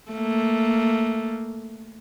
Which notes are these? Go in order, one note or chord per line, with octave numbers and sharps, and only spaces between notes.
A3 A#3